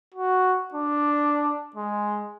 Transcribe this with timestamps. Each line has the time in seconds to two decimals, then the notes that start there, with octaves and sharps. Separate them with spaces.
0.14 F#4
0.74 D4
1.76 G#3